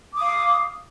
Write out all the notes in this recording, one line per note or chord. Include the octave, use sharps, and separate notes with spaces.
F5 D6 D#6